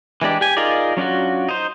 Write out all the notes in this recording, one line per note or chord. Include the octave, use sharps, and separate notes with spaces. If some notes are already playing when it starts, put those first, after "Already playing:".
E3 G#3 D4 G4
G4 G#5
D#4 F4 G#4 A#4 D5
F#3 C#4 D4 F4 F#4
D#4 C5